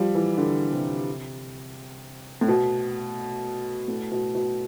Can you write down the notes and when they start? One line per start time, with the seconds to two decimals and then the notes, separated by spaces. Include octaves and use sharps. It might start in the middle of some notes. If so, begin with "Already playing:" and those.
Already playing: F3 G3
0.15 E3
0.38 D3
0.72 C3
2.41 A2
2.48 B2
3.88 A2
4.11 B2
4.35 B2